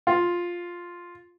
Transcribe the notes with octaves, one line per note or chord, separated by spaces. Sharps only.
F4